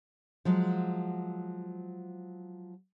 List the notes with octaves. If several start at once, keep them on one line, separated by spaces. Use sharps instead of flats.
F3 F#3 G#3